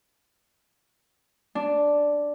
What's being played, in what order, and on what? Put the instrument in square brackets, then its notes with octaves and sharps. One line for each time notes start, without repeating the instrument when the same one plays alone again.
[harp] D4